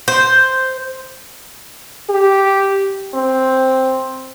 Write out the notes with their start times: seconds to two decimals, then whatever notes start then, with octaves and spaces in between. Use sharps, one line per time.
0.08 C5
2.10 G4
3.14 C4